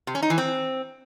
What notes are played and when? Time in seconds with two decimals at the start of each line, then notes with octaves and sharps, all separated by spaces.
0.07 C3
0.15 C#4
0.22 D#4
0.30 E3
0.38 C4